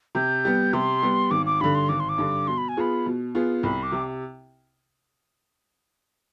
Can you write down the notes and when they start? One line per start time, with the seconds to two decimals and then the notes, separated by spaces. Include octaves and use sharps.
0.15 C3 G6
0.45 G3 B3
0.73 C3 C6
1.03 G3 B3
1.31 G#1 D6
1.46 D6
1.60 G2 D3 B5
1.75 C6
1.89 G#1 D6
2.00 C6
2.09 D6
2.18 G2 D3
2.47 B2 C6
2.58 B5
2.69 G#5
2.77 B3 F4 G#4 B5
3.06 B2
3.35 B3 F4 G#4
3.63 C2 B5
3.83 D6
3.92 C3